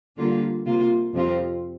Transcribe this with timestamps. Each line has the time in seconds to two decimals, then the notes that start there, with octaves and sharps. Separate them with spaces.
0.17 D3 G3 A#3 F4
0.65 C3 A#3 F4
1.13 F2 C3 F3 C4 F4